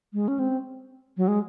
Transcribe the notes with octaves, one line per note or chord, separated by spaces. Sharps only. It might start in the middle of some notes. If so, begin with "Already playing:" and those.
G#3
C#4
C4
F#3
G#3